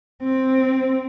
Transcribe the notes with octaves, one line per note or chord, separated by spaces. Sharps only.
C4